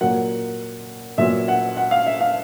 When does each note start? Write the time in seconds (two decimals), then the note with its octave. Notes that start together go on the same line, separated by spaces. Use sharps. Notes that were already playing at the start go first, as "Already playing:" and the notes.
0.01 A#2 F#3 A#3 F#5
1.18 A#2 F#3 B3 E5
1.48 F#5
1.77 F#5
1.91 F5
2.06 E5
2.21 F5